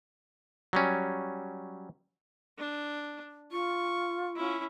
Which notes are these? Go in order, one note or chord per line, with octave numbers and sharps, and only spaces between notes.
F#3 G3 C#4
D4
F4 C#6
C#4 E4